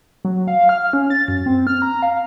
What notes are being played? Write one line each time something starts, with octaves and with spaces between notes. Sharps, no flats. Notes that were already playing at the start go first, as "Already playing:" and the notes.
F#3
F5
F6
C#4
A6
F#2
C4
F6
A#5
F5